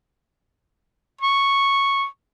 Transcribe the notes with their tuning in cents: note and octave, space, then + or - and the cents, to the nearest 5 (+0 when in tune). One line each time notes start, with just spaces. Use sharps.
C#6 -5